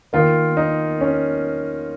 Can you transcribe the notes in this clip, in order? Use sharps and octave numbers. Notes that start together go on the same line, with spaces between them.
D#3 A#3 F4
D#4
C#4